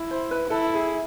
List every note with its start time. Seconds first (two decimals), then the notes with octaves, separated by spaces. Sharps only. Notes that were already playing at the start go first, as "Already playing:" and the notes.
Already playing: E4
0.11 C5
0.31 B4
0.50 E4 A4
0.75 G#4